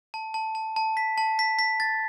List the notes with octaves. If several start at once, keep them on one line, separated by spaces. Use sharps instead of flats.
A5
A5
A5
A5
B6
A5
B6
B6
A6